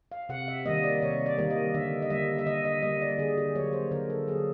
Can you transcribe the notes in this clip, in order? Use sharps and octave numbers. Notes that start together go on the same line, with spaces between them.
F5
C3 F#5
E5
D#3 G3 A#3 D#5
D5
C3 C#5
D5
D#3 G3 A#3
D#5
D3 E5
D#5
G3 A#3 E5
E5
D3 D#5
D#5
G3 A#3 D#5
D5
D3 G#4
G4
F#3 A#3 C#5
C5
D3 A#4
A4
F#3 A#3 G#4